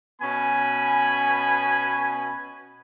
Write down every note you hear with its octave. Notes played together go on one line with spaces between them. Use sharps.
B2 B3 C#4 G#5 B5